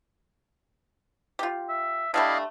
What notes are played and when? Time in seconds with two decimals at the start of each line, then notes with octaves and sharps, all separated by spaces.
1.39 F4 G4
1.69 E5
2.14 D3 G3 A3 E4 D5 D#5 F5